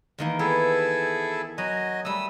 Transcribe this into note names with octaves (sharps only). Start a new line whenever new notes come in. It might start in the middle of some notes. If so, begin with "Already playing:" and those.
E2 D#3 A#3
B3 E4 G#4 A4
F#3 F#4 D#5 G#5
G3 A3 D#6 E6